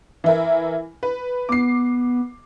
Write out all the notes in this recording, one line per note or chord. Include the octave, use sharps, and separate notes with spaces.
E3 E4 A#4
B4
B3 D6 C7